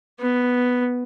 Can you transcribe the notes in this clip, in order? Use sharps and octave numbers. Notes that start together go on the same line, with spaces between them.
B3